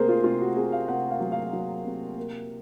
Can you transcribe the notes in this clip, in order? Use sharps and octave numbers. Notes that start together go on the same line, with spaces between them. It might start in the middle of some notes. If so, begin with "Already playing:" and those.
Already playing: C3 A#3 G#4 A#4 C5
F4
C3 F4
F#4
C3 G#4
F5
C3 F#5
F5
F#3
F5
F#3
C3
A#3